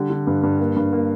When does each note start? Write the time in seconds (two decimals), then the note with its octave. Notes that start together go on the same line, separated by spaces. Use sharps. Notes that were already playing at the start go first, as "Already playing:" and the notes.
Already playing: D3 G3
0.10 D3
0.27 G2
0.43 G2
0.59 A#3
0.76 G2
0.93 A#3